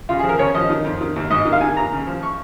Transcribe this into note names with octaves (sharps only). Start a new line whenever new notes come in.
C#3 F4
G#4
F3
A#4
C#3 C#5
F3 D#5
D#3
F2
D#3
D#2
G#2 D#5
D#3
F5
D#3 G#5
D#2 A#5
C#3
F3
C#6